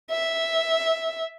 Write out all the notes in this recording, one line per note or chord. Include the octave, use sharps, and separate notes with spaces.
E5